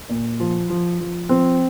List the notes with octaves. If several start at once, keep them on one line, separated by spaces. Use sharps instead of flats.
A#2
F3
F3
F3
F3 C4